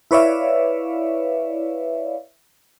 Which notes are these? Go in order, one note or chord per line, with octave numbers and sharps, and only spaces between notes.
E4 B4 C#5 D5 E5 F5